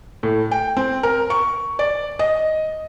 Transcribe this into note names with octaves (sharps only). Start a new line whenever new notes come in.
A2
G5
C4
A#4
C#6
D5
D#5